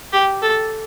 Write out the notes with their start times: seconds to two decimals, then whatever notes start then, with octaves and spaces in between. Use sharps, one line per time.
0.13 G4
0.43 A4